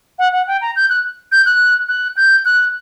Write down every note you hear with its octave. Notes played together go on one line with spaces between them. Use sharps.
F#5
F#5
G5
A#5
G6
F#6
G6
F#6
F#6
G6
F#6